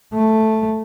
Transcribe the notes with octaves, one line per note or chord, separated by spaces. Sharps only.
A3